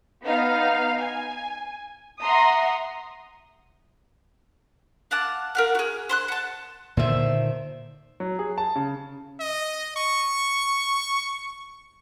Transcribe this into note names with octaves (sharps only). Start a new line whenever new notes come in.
B3 D#4 F5
G#5
E5 F#5 A#5 C6 D#6
F5 F#5 A5 D6
A#4 F5 F#5
F#4 G#4
C5 C6 F#6
F#5 A5
A#2 D3 D#3 C5 E5
F#3
G#4
A5
C#3
D#5
C#6